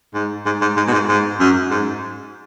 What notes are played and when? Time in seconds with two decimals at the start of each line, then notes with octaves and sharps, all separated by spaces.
0.14 G#2
0.46 G#2
0.61 G#2
0.77 G#2
0.87 B2
0.93 G#2
1.08 G#2
1.40 F#2
1.71 G#2